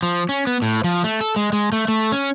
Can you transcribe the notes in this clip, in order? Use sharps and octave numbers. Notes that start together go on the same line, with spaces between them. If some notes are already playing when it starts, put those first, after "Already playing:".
F3
C#4
B3
A2
F3
A3
A4
G#3
G#3
A3
A3
C#4